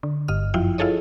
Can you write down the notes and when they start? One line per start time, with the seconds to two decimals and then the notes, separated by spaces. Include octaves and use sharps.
0.03 D3
0.28 G1 G2 D#5 F6
0.54 F#2 F3 E4 F4 G5
0.78 E4 F4 G#4 A4 C#5 D#5